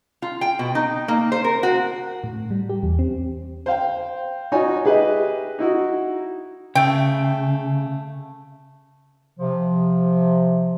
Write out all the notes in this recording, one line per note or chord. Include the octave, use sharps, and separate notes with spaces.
F4
G5
B2
D#4
A#3
C5
A#4
F#4
A2
G3
G4
E2
C4
C5 F5 G5
D#4 F4 F#4 C#5 G#5
G4 G#4 B4 D#5 E5
D#4 E4 F#4
C#3 A3 G5
C3 F3